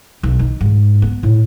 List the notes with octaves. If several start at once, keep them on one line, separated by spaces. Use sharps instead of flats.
B1
D#3
G#2
B3
A2